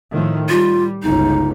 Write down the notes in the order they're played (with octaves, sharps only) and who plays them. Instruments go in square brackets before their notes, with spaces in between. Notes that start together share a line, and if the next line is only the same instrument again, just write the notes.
[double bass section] A2 D#3 F3
[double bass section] G3 [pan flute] F4
[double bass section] G1 C#2 [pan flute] D#4